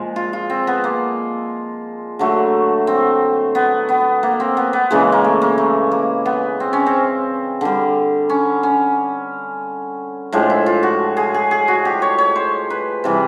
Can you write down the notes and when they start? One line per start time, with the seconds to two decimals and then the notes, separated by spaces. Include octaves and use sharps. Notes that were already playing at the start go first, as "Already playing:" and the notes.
Already playing: A#2 F3 G#3
0.16 F4
0.33 F4
0.50 C4
0.67 B3
0.84 A#3
2.19 D3 F#3 A3
2.87 C4
3.55 B3
3.89 B3
4.23 A#3
4.40 C4
4.57 B3
4.73 B3
4.90 C#3 E3 G#3 A#3
5.12 A#3
5.24 A3
5.42 A#3
5.58 A3
5.92 A#3
6.26 B3
6.60 C4
6.73 C#4
6.86 C4
7.61 D3 G3
8.29 C#4
8.63 C#4
10.32 A2 F3 G#3 D4
10.50 E4
10.66 F4
10.83 F#4
11.17 G#4
11.34 G#4
11.51 G#4
11.68 F#4
11.85 G4
12.02 C#5
12.18 C#5
12.36 C5
12.70 B4
13.04 C3 E3 G3